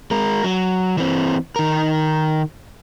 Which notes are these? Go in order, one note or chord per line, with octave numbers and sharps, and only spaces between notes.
G#3 A#4
F#3
E3 C4
D#3 A#4